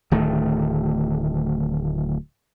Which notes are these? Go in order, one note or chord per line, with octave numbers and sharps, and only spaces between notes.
D1 D#3 A3